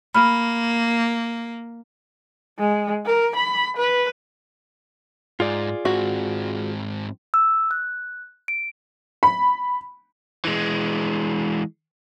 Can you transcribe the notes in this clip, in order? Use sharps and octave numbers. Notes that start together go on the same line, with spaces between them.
A#3 B5 F6
G#3
A#4
B5
B4
G#2 F4 G#4 D5
G#2 C4 F#4
E6
F#6
D7
B5
E3 G#3